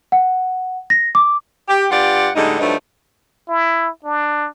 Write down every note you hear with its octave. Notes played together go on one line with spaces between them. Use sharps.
F#5
A#6
D6
G4
G2 F4 G4 D5 F#5
A2 D3 G3 G#3 D#4
G2 F3 F#3 A3 D4 D#4
E4
D4